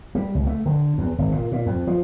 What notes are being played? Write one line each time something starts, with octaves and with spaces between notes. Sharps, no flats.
G3
C#2
A3
D3
E2
G#1
A#2
A#2
F2
F3